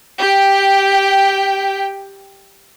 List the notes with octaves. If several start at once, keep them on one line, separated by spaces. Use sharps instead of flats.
G4 G5